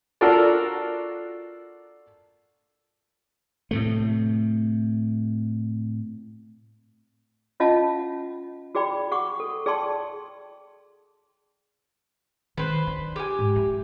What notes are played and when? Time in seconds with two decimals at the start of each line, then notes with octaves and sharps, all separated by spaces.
0.21 D4 F4 F#4 A4 A#4 D5
3.71 A2 C3 A3
7.60 C#4 F4 D#5 F5 F#5 A5
8.75 F#4 G#4 D5 G5 B5
9.11 G#4 F#5 C#6 D6
9.40 A4
9.66 G#4 D5 G5 A5 C6
12.57 D#3 B4 C5
12.87 D4
13.16 G4 G#5
13.39 G#2
13.56 E4